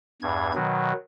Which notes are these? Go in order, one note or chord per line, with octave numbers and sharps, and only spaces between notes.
E2 G2 G#6
B2 D#3 F#3